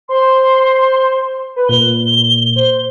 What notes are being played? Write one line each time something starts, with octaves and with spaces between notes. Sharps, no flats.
C5 C6
B4
A#2 G7
C5